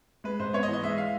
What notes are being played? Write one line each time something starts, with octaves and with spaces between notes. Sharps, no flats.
G#3 B4
G#2 C5
B3 C#5
D#5
E3
D#5
G#3 E5
F5